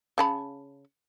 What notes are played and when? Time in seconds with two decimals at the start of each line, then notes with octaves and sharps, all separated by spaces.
0.18 C#3 A5 B5